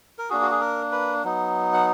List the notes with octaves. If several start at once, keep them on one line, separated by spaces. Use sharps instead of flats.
A#4
A#3 D4 F#4 G#4
F#4
G#4
A#4
B4
F#3 B3 D#4
F#5